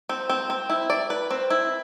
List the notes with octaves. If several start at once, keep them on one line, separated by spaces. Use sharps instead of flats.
C4
C4
C4
E4
D5
B4
C4
E4